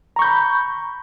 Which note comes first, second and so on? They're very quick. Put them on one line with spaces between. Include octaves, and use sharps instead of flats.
A#5 C#6 G6 B5